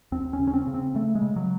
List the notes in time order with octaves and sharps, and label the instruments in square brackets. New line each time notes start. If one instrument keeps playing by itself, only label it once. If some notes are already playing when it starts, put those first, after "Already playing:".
[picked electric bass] D#2 C4
C#4
C#3
C#4
C4
C#3
C4
C#3 A3
G#3
C#3
F#3